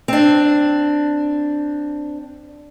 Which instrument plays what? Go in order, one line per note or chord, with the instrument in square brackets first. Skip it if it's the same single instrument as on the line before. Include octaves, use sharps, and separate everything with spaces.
[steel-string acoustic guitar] C4 D4